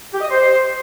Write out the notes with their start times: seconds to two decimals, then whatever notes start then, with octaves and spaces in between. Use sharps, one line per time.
0.13 G4
0.21 D#5
0.30 C5